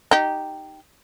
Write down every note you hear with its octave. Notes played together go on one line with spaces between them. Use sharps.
D#4 G4